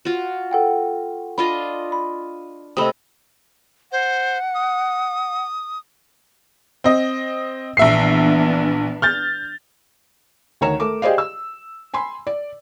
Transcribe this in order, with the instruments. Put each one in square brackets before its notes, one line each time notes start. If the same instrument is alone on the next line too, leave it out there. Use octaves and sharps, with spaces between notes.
[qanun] F4 F#4
[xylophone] A4 F#5 G5
[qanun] D4 F4 D#5 [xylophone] B5
[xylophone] B5
[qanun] C3 A3 [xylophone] D#5 B5 D#6
[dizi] C5 [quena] F#5
[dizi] D#6
[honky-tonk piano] C4 D#5
[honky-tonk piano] A#1 E5 C7 [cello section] E3 B3 D4
[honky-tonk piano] F6 G6 A6
[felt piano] D2 D#3 C#5 A#5 E7
A3 A#4 D6
G4 G#4 C5 D5 D#5 F5
E6
G#5 B5 C6
D5